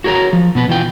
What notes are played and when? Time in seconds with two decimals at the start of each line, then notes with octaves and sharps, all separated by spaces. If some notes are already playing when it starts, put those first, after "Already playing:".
0.04 F#4 G#4 A#4 C#5 A#5
0.33 F3
0.55 B2 B3 B4
0.68 B2 E3 F4 G5